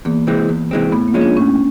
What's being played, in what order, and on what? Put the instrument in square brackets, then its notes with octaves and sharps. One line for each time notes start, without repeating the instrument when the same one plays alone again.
[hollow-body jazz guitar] E2 [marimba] A#3
[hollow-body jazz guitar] C3 E3 G#3 C4
E2
C3 E3 G#3 C4
[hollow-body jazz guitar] A2 [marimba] B3
[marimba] A#3
[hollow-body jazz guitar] F3 G#3 C#4
[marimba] D4
[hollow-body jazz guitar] A2 [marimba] C#4